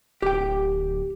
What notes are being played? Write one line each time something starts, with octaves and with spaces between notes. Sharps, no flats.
D1 G4 G5